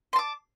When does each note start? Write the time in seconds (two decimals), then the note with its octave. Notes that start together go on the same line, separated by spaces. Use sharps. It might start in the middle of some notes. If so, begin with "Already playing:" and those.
0.13 C6
0.16 A5
0.19 D6